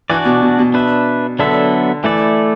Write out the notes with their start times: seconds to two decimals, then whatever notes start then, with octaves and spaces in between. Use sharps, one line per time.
0.10 E3 D4 F#4 D5
0.25 B2
0.42 B2
0.58 B2
0.74 D4 B4 E5
1.39 D3 F#3 B3 D4 A4 E5
2.04 E3 A3 E4 A4 D5